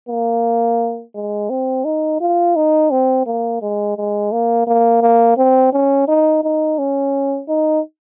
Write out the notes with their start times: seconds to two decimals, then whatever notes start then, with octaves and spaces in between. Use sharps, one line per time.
0.09 A#3
1.15 G#3
1.50 C4
1.85 D#4
2.21 F4
2.56 D#4
2.91 C4
3.26 A#3
3.62 G#3
3.97 G#3
4.32 A#3
4.67 A#3
5.02 A#3
5.37 C4
5.73 C#4
6.08 D#4
6.44 D#4
6.79 C#4
7.49 D#4